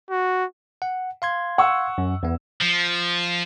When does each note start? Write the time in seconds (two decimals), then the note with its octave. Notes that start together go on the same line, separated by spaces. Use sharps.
0.10 F#4
0.82 F#5
1.22 F5 C6 G#6
1.58 F#5 C#6 E6
1.98 F#2
2.23 E2 B3
2.61 F3